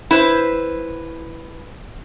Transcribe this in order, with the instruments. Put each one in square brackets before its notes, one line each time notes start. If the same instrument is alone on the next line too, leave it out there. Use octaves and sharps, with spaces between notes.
[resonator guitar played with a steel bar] E4 B4 C5